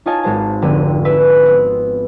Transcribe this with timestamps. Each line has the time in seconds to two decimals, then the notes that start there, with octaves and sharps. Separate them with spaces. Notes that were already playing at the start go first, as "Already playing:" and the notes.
0.06 D#4 F4 C#5 D#5 G#5 A5
0.23 G#1 G#3 C5 A5
0.62 F1 D3 C4 D#7
1.05 B4 E5 E6
1.46 B3 C4